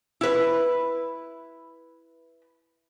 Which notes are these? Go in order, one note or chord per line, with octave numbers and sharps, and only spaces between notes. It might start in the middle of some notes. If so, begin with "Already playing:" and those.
E4 B4